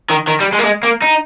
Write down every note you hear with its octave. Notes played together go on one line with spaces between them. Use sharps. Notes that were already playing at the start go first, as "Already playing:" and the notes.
D#3
D#3
G3
G#3
A#3
G#3
A#3
D#4